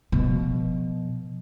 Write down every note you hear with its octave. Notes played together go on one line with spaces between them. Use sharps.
B2 F3